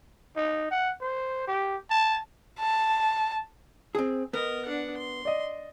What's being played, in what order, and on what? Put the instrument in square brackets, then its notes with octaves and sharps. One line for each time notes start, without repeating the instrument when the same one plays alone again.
[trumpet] D#4
F#5
C5
G4
A5
[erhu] A5
[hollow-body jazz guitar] C4 G#4
[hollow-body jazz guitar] B3 [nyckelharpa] A#4 D#5
[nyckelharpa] D4 F#5
C6
[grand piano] D5 D#5